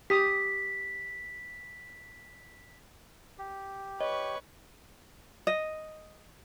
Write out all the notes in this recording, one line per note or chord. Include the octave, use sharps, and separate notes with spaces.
G4 D#6 B6
G4
B4 C#5 D#5 C#6
D#5